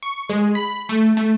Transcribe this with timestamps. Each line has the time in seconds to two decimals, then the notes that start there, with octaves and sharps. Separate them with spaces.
0.03 C#6
0.29 G#3
0.55 B5
0.89 A3
1.17 A3